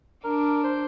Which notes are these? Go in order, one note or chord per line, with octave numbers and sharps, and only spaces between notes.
D4 A#4
C5